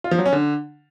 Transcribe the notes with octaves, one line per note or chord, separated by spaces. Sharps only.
F4
F3
F#3
C#4
D3